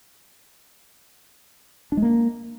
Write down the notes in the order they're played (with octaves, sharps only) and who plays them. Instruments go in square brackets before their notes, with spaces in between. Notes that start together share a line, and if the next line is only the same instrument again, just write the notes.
[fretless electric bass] D4
G#3
A#3